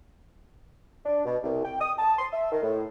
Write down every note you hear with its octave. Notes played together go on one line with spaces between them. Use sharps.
D4
B2
C2
G5
D#6
A5
C6
E5
D#3
A2